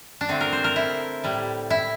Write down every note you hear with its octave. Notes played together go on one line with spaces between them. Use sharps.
D4
D3 A3 C4
A#4
C5
A#4
E4
A2 G3
E4